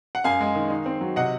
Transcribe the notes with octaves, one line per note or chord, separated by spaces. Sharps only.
F#5
F#2 F5 G#5
G#3
D#3
D#4
C4
F#3
C3 D#5 F#5